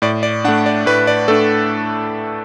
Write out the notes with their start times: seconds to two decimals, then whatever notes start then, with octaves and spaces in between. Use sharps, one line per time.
0.02 A2 D5
0.23 D5
0.44 D4 F#5
0.48 A3
0.66 D5
0.86 A2 B4
1.07 D5
1.28 A3 D4 A4